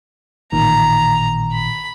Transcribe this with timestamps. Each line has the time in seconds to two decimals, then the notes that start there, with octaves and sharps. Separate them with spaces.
0.52 A1 A#2 D#3 A#5
1.53 B5